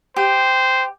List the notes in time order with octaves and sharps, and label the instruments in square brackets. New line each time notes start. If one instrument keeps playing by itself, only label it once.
[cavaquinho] G4 [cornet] C5